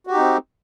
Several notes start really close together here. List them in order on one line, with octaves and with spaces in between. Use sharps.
F#4 G4 D#4 C4